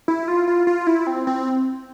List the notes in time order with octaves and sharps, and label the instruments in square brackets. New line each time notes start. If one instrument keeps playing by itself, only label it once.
[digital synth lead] E4
F4
F4
F4
E4
C4
C4